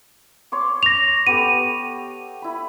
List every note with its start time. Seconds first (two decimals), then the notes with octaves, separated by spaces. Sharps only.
0.52 C#5 C6 D6
0.83 A#6 F7
1.27 B3 G4 A4 D#7
2.42 E4 B5